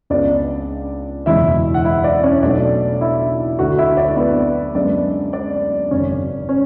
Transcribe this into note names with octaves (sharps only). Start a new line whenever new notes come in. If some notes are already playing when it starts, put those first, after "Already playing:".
C#2 C#3 G#3 B3 D4 D5
F#1 E2 B2 G#3 E4 E5
F#5
E4 E5
D4 D5
C#4 C#5
B1 B2 A3 D4 D5
E4 E5
D2 D3 A3 F#4 F#5
E4 E5
D4 D5
B3 B4
F#2 D3 G#3 B3 D4 D5
D4 D5
G#1 F#2 C#3 C#4 C#5
C#4 C#5